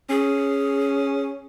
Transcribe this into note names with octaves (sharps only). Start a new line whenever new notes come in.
C#4 G#4